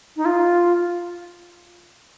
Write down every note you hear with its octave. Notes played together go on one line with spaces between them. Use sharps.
D#4
F4